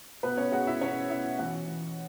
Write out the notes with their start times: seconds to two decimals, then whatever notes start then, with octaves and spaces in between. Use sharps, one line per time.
0.23 B2 B3 B4
0.37 C#4 C#5
0.52 G#3 F#4 F#5
0.67 E4 E5
0.81 B2 C#4 C#5
1.10 B2 E4 E5
1.39 E3 F#4 F#5
1.67 E3